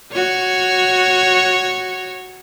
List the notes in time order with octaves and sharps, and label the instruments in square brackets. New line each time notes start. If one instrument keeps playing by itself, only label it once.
[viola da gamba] F#4 C#5